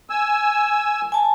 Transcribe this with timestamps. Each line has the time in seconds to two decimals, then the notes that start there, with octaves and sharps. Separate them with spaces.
0.10 G#5 E6
1.12 G#5 A5